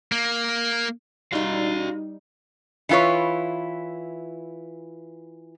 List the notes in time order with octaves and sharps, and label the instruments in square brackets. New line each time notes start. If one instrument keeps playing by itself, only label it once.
[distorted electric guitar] A#3
[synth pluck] G3 D#4 [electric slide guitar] F#4 F5
[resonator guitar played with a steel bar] E3 E4 F4 B4 C#5